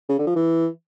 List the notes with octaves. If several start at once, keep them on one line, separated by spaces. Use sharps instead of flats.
C#3
D3
F3
E3